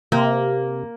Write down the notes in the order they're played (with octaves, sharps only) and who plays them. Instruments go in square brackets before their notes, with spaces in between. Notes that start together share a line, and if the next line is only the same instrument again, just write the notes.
[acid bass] C3 [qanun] A#3